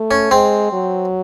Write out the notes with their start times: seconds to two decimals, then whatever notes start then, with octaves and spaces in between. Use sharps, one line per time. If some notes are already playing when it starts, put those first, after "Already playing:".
Already playing: A3
0.11 C#4
0.31 G#3 C4
0.73 F#3